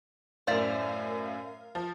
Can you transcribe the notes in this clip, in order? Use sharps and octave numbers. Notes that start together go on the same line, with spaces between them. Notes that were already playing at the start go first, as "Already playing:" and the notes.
F#2 A2 A#4 C5 D5 E5 F5
F3